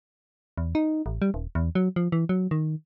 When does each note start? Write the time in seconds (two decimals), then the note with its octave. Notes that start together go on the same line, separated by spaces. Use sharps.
0.58 E2
0.75 D#4
1.06 A1
1.22 G3
1.34 D#1
1.55 E2
1.75 F#3
1.96 F3
2.12 E3
2.29 F#3
2.51 D#3